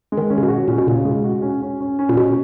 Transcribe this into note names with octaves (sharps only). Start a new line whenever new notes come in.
G#3
D#3
C#4
C#3
B2
F#4
A#2 C#4
B2
A#2 C#3
G#3
F#4
C#4
C#4
C#4
C#4
A#2
B2 C#4